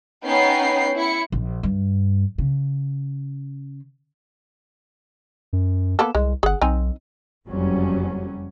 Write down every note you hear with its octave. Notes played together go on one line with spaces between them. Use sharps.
B3 C#4 D#4 G5 C7
E4 C#7
A#1
G2
C#3
F#2
A#3 B3 A4
C2 G#3
G1 G#4 F#5
B1 C4 D#4 G#5
F#1 F2 F#3 G3 C#4